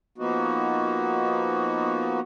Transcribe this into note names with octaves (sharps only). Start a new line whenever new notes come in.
F3 A#3 B3 D#4 F#4